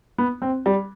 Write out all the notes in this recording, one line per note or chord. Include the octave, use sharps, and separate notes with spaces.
B3
C4
G3